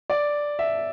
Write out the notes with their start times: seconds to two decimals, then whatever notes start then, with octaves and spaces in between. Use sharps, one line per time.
0.10 D5
0.59 E5